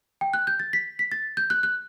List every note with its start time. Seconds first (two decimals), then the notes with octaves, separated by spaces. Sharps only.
0.21 G5
0.34 F#6
0.47 G6
0.60 A6
0.73 B6
0.99 B6
1.12 A6
1.37 G6
1.50 F#6
1.63 F#6